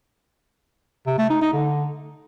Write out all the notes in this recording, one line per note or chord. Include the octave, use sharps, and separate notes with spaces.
C3
A3
D#4
D#4
D3